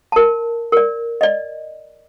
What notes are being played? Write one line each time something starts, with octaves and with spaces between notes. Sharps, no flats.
A#4 A5
A#4 D5
D5 D#5